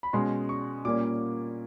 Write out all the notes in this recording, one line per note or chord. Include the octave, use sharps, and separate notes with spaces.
B5
B2 G#3 C#4 C6
C#6
A#2 G3 A#3 C#4 D6